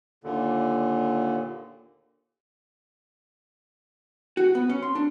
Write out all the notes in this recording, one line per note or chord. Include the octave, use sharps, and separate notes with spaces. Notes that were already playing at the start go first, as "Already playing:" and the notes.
D#2 A#2 D3
F#4
B3
C#4
C6
D4